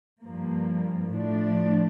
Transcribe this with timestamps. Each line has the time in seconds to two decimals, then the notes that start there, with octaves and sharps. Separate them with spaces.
0.21 G2 F3 A#3
1.11 A2 F3 A3 D4